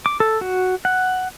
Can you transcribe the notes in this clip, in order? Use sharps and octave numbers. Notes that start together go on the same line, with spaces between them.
D6
A4
F#4
F#5